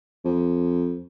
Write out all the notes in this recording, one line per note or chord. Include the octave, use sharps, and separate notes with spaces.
F2